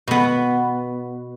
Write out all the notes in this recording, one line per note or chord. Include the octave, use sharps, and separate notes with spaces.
B2 B3